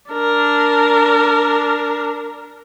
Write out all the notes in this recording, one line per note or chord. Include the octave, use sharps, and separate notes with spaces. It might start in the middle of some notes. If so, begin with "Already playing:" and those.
D4 A#4